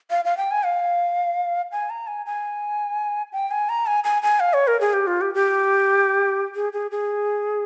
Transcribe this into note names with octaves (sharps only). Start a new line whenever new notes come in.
F5
F5
G5
G#5
F5
G#5
A#5
G#5
G#5
G5
G#5
A#5
G#5
G#5
G#5
F5
C#5
A#4
G#4
G4
F4
G4
G4
G#4
G#4
G#4